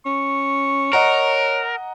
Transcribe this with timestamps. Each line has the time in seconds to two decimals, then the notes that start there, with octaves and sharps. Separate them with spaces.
0.06 C#4 C#6
0.93 A#4 C#5 D#5 F#5 A#5